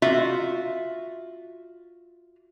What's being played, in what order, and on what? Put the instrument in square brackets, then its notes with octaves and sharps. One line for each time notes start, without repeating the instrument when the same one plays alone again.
[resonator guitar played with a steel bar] F4 F#4 E5